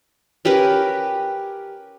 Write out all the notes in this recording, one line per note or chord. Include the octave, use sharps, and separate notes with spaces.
C#4 G4 A#4 B4